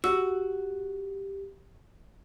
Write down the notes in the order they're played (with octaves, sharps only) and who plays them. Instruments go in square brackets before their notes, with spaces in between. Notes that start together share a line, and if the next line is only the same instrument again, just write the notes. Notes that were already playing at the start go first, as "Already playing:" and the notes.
[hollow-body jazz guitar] F#4 [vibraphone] G4 [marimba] E6